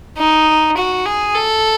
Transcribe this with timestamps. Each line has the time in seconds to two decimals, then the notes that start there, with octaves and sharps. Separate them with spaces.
0.17 D#4
0.77 F#4
1.06 G#4
1.35 A4